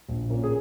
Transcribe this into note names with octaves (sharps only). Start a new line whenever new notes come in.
A#1
A#2 A#3 C#4
G#4